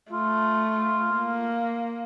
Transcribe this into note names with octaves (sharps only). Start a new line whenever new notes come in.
A3 F4
A#3